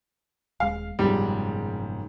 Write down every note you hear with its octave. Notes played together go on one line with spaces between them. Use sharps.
D#1 G#3 F5
F#1 G#2 B2 F3 G3